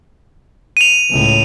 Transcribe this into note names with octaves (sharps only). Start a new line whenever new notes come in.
D#7 F7
C#2 A2